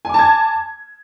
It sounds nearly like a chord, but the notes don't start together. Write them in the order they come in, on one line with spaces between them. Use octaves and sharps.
G#5 D6 A5 G#6